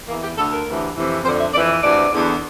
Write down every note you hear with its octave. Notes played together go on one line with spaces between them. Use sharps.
E2 E3 A#3
G4
D2 D3 A4
A#4
D2 C3 E3
F2 C3 E3
F2 D3 C5
E5
F2 E3 D5
D2 C3 E3 D5
E2 D3